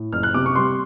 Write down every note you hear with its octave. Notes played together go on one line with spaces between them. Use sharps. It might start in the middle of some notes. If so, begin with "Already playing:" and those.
Already playing: A2
F#1 F6
F#6
C3 D6
C#6
G3 C6